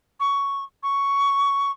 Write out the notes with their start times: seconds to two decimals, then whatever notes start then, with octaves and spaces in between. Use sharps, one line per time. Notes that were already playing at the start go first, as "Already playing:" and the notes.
0.20 C#6
0.83 C#6